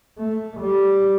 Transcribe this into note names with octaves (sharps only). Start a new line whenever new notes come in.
A3
G3